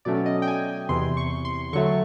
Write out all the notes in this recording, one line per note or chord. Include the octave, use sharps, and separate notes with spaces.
B2 F#3 A3 C#4 D5
D#5
G5
G#5
E2 C3 E3 C6
C#6
C6
D3 F#3 A3 C#6